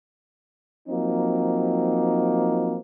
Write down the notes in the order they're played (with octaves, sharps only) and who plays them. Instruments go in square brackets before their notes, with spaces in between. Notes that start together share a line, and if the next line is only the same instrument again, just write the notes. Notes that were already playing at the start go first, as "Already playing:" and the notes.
[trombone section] F3 F#3 A#3 C4 D#4